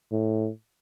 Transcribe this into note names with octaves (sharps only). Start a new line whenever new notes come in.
A2